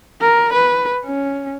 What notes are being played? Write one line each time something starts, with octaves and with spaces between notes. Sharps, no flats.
A#4
B4
C#4